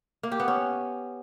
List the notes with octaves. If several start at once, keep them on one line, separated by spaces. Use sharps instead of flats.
A#3
G4
B3
C#4